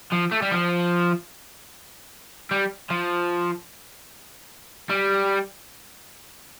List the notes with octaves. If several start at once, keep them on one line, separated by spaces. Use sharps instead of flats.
F3
A3
G3
F3
G3
F3
G3